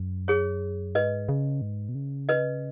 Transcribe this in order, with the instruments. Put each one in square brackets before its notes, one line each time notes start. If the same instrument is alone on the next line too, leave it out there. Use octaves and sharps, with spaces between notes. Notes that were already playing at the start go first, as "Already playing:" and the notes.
Already playing: [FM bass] F#2
[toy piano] G#4 C#5
[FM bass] G#2 [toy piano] B4 D#5
[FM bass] C#3
G#2
B2
C#3
[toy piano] B4 D#5